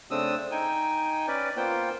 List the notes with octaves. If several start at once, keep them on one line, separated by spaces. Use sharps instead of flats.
C#3 A3 C4 D4 D#6 E6
D#4 G5 G#5
C#4 B4 D5
A#3 B3 F4 C5 G5